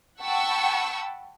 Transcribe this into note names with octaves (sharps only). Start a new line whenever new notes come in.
F#5 G5 A5 B5 C#6 E6